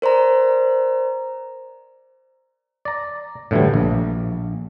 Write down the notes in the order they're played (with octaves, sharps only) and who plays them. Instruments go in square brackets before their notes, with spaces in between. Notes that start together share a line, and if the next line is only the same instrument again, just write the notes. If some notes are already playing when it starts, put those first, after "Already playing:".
[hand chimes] A#4 C5 D5 A#5
[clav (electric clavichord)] D5 A#5
A2 D3 E3 F#3 G3
A#1